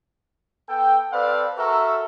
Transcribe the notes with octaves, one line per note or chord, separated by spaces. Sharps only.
B3 A4 G5
C4 A4 B4 D5 F5
F#4 A4 A#4 E5